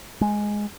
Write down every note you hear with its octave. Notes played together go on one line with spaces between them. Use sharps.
G#3